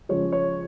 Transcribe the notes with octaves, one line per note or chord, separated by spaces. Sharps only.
C#3 F3 G#3 F4 C#5
C#5